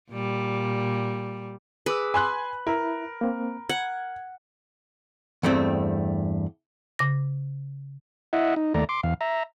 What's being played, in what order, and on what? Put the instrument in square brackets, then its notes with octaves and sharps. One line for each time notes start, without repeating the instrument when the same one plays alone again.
[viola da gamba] A#2 G3
[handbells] G#4 D6 E6 [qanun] B4
[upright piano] G#5 C6 F#6 [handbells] B5
[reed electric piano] E4 E5 [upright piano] A#4
[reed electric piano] A#3 C4
[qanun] F#5 [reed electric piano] G#6
[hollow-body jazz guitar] E2 G2 A3 C4
[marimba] C#3 D6 A#6
[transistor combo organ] E4 D#5 E5 F#5
D#4
D#2 A3 D5 A#5
C6 D6
E2 F5
E5 A#5